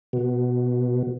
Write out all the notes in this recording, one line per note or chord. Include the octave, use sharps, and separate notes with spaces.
B2